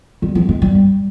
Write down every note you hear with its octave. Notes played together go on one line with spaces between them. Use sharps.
G3
F3
G#3
G3